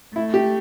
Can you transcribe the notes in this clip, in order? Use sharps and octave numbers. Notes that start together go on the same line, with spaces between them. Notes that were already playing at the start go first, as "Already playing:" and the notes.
A3 E4
G4